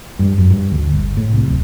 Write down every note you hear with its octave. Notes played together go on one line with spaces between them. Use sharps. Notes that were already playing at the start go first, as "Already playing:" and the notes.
G2
F#2
G2
D2
G1
A2
C2
D1